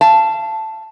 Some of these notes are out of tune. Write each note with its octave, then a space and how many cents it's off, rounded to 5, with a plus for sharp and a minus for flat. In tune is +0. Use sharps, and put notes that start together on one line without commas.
F5 -35 A5 +0